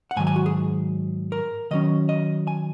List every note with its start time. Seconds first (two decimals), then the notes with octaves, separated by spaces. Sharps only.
0.11 F#5
0.16 G#2 D#3 F#3 G#5
0.27 G#5
0.36 F#4
0.46 G#4
1.32 A#4
1.71 D#3 F#3 C#4 D#5
2.09 D#5
2.47 G#5